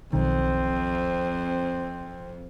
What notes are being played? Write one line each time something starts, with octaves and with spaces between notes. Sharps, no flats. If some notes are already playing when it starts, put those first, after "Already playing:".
B1 F2 D#3 C4